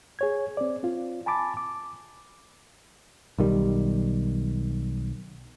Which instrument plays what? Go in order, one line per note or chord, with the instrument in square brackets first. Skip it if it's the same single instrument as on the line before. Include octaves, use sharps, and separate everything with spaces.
[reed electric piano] G#4 C#5 G#6
C4 D5
C4 F4
G#5 A5 B5 D6 A6
D6
[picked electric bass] B1 D#3 G3